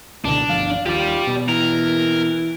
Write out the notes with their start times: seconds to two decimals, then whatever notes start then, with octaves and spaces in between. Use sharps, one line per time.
0.25 C#2 B2 D3 D4
0.50 G1 F3 F5
0.86 D#2 F4 G4 D5
1.27 B2
1.48 E3 A#4